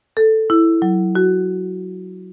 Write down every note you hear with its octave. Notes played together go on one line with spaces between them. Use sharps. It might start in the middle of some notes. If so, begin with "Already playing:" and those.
A4
E4
F#3
F#4